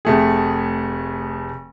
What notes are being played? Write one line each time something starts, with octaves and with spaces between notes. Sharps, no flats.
F1 A3 G#4